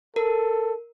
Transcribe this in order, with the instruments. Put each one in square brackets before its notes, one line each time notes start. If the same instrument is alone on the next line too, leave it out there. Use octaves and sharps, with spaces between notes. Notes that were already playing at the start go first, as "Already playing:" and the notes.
[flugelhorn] A4 [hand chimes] A#4